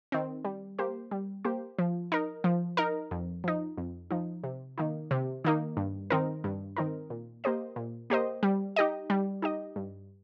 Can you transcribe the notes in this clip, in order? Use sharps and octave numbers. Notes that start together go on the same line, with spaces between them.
D#3 C4
G3
A#3 G4 C5
G3
A#3 G4 C5
F3
D#4 A#4
F3
D#4 A#4
F2
F3 D#4
F2
F3 D#4
C3
D#3 A#3 D#4
C3
D#3 A#3 D#4
G2
D#3 C4 D#4 A#4
G2
D#3 C4 D#4 A#4
A#2
A#3 G4 C5 D#5
A#2
A#3 G4 C5 D#5
G3
D#4 G4 D#5
G3
D#4 G4 D#5
G2